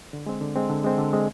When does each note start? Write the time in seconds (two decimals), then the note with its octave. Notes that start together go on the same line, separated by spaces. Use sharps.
0.13 D3
0.26 G#3 C4
0.41 D3
0.56 G#3 C4
0.70 D3
0.84 G#3 C4
0.98 D3
1.13 G#3 C4